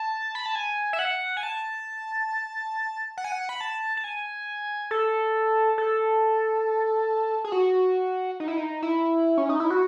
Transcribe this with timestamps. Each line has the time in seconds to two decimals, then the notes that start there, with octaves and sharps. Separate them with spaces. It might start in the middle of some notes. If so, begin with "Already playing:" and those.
Already playing: A5
0.35 B5
0.46 A5
0.55 G#5
0.93 E5
0.99 F#5
1.37 G#5
1.43 A5
3.18 F#5
3.24 G#5
3.32 F#5
3.49 B5
3.61 A5
3.97 A5
4.04 G#5
4.91 A4
5.78 A4
7.44 G#4
7.52 F#4
8.40 D#4
8.48 E4
8.58 D#4
8.82 E4
9.38 C#4
9.49 D#4
9.60 E4
9.70 F#4